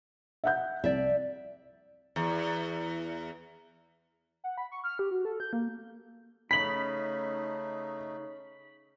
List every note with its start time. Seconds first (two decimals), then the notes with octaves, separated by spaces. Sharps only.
0.44 E5 F#5 G6
0.84 C2 D5 E5
2.16 E2
4.44 F#5
4.57 B5
4.71 C#6
4.84 F6
4.99 G4
5.11 F#4
5.25 A4
5.40 G6
5.53 A#3
6.51 C#3 A3 D#4 B5 B6 F#7